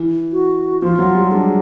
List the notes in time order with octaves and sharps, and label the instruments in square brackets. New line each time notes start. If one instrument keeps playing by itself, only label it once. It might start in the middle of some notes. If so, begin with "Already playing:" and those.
Already playing: [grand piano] E3
[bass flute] F#4
[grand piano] F3 [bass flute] F4
[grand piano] F#3
G3
[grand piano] G#3 [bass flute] D4